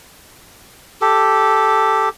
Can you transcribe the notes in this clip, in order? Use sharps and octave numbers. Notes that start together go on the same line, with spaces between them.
G4 A4